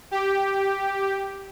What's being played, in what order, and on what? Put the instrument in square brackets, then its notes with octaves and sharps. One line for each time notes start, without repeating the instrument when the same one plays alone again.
[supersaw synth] G4